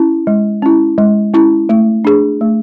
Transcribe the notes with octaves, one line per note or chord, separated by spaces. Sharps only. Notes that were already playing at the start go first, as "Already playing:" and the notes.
Already playing: C#4 E4
G#3
C#4 E4
G#3
C#4 E4
A3
D4 G#4
A3